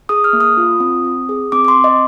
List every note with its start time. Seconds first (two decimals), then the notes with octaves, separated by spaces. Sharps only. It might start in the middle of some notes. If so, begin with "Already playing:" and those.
0.09 G#4 D#6
0.24 F6
0.33 A#3
0.40 D#6
0.57 F4
0.80 C4
1.04 C4
1.29 G#4
1.52 C4 D6
1.65 D6
1.68 C6
1.76 C4
1.84 D#5